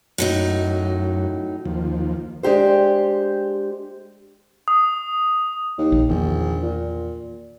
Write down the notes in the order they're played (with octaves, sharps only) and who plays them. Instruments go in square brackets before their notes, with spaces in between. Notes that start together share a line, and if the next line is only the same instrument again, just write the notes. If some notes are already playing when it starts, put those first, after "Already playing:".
[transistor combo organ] F#2 [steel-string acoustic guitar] A2 F#3 D#4
[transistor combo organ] D#2 F3
[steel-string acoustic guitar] G#3 D4 G4 C5
[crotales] D#6
[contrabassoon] D#2
[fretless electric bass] A#1
[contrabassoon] A#1 [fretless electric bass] E2 D#3
[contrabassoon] A#2